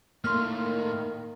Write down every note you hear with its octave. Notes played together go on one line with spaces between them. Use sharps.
A2 D#3 A#3 C6 F6